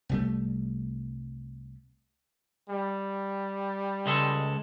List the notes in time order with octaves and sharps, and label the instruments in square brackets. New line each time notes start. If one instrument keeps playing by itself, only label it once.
[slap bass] C2 G3 A3
[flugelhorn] G3
[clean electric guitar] C#2 G#3 A4